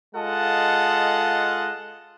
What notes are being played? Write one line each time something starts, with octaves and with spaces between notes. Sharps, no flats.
G#3 F4 A4 D#5 F#5 A5